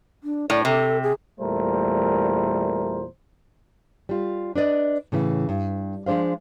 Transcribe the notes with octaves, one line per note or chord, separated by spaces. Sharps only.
D4
A2 D5
C3 A4
G#4
E2 A#2 G3 A3 A#4 C5
G3 F4
D4 B4 D5 D#5
A2 C#3 E3
G2
F3 G#3 D4 C5 F5